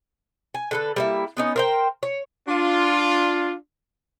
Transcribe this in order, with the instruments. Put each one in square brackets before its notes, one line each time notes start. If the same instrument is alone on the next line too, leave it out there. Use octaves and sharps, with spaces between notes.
[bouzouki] G#5
D3 A4 B4
G3 A#3 E4
B3 C#4 D#4
A#4 C5 G5
C#5
[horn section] D4 F4